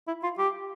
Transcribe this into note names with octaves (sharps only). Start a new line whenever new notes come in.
E4
F4
G4